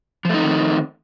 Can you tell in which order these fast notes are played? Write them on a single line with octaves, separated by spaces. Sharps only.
F3 A3 D#4 C4 D#3